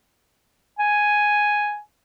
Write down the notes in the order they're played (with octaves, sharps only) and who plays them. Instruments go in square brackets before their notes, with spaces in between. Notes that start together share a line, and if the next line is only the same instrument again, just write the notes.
[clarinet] G#5